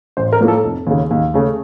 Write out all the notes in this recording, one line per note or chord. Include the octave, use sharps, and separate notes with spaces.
A1 C5
A#4
A2 F3 A#3
A4
F1
D#2 C#3
D#2
C#3 A3